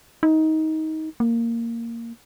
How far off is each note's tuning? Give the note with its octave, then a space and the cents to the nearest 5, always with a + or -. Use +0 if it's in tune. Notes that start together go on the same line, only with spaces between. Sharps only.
D#4 +20
A#3 -10